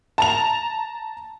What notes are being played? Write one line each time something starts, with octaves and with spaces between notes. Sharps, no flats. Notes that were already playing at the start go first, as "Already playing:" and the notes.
A5 A#5 F7